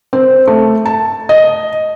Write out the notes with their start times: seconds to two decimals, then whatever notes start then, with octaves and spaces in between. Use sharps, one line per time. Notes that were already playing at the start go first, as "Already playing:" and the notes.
0.13 C4
0.47 A3
0.86 A5
1.29 D#5